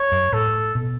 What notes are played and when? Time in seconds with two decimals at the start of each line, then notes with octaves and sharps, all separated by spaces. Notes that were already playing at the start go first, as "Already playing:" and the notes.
Already playing: C#5
0.12 F#2
0.33 A2 A4
0.75 B2